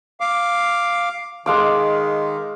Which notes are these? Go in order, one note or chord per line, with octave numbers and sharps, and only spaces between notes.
F5 D6
D#3 G#3 F5 D6